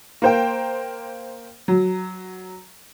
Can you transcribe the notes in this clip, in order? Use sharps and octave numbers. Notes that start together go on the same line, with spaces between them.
A#3 C5 G5
F#3